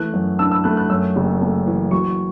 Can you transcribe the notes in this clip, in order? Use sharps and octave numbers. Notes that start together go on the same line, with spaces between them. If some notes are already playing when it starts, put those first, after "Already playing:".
Already playing: E3 A3 F#6
F#2
D4 E6
E6
A3 F#6
F#6
F#2 E6
F#1
A3
E3
F#3 C#6